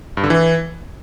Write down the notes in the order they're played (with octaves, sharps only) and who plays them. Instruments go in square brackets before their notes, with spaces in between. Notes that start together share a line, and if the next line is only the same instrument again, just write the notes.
[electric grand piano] G2
D3
E3